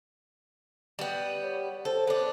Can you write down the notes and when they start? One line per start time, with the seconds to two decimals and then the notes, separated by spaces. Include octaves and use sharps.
0.99 G3 B3
1.43 C#5
1.85 A4 C5
2.07 B3 D4